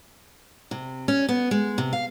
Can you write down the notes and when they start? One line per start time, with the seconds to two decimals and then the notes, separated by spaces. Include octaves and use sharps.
0.71 C3
1.08 C#4
1.29 B3
1.51 G#3
1.78 C3
1.93 F5